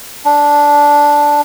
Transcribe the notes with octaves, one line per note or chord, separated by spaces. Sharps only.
D4